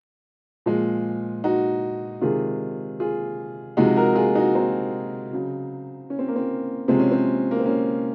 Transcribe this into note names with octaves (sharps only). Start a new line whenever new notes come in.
A#2 F3 G#3
D#4 F#4
C3 D#3 G#3 F4 G#4
F4 G#4
C3 F3 G#3 D#4 F#4
F#4 A#4
F4 G#4
D#4 F#4
C4 D#4
C#3 F#3
C#4
C4
A#3
C4
C3 F3 G#3 C4
C#4
C4
A#3
C4
A#3 C#4